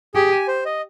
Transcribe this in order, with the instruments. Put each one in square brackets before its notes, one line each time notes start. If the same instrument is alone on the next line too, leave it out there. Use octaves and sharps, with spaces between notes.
[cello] G4 [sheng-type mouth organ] G#4
[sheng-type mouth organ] G#5
C5
D#5